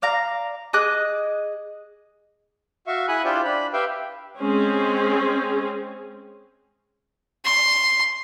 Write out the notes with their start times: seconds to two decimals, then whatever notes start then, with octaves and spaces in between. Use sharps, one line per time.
0.02 D5 F5 A#5
0.73 G#4 D#5 D6 F#6
2.87 F#4 E5 F5 C#6
3.08 E4 G#4 G#5 B5 D#6 F#6
3.24 D4 E4 F4 G4 C5 D5
3.45 D4 B5
3.73 G4 B4 E5 F5 G5
4.41 G#3 C4 C#4 G#4
7.44 C6